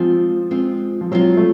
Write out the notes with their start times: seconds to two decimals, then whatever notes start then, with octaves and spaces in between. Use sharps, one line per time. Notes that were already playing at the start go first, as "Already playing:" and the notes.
Already playing: F3 G#3 C4 F4
0.51 G#3 C4 F4
1.01 F3
1.12 F#3 G#3 C4 F4
1.37 A3